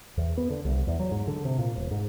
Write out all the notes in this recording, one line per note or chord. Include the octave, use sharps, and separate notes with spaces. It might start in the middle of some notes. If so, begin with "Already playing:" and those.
E2
B3
D3
C2
E2
F#3
G#2
D3
C3
A#2
E1
G#2